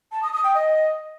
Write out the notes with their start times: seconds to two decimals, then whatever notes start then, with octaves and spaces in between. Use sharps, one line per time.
0.12 A5
0.23 D#6
0.33 D#6
0.44 G5
0.55 D#5